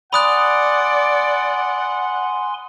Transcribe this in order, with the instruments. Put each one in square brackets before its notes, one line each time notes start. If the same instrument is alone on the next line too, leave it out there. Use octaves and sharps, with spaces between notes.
[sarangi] D5 [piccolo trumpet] F#5 [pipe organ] G#5 C6 [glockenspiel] B5 D#6 F#6